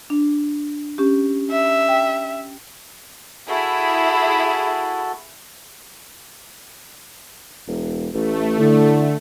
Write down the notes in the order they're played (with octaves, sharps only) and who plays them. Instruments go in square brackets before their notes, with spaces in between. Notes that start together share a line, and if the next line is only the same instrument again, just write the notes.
[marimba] D4
C#4 G4
[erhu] E5
[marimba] G5
[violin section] E4 G#4 [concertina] F#4 A4
[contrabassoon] E1
[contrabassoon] A1 [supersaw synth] A3
[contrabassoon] A2 [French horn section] D3